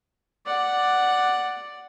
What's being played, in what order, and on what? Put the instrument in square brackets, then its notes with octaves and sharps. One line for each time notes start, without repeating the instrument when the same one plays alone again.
[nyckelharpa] D5 F#5